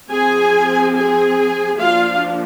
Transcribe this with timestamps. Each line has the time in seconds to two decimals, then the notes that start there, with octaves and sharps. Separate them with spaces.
0.10 F3 C4 G#4 G#5
0.94 G#4 G#5
1.78 F3 A#3 D4 F4 F5